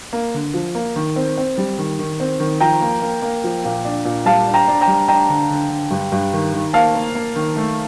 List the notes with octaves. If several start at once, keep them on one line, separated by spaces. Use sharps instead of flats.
A#3
D3
F3
A#3
D#3
C4
C4
G3
D#3
D#3
C4
D#3
F3 G5 A#5
A#3
A#3
A#3
F3
A#2
D4
A#2
G3 F5 A5
D4
G5 A#5
D4
G5 A#5
G3
D4 G5 A#5
D3
D3
D3
G2
G2
D#3
D#3
A#3 F5 A5
A#3
A#3
D#3
A3